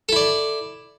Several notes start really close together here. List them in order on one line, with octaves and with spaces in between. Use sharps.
A4 E4 D5